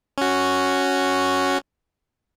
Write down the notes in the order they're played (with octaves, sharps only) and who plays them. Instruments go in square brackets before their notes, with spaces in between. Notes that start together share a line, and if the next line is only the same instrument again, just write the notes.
[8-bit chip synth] C#4 F#4